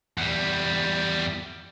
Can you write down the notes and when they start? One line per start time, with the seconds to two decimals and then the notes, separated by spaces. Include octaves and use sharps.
0.18 E2 G3